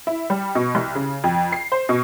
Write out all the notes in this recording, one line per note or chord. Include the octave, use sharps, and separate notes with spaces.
E4
G3
B2
C2
C#3
F2
C7
C5
B2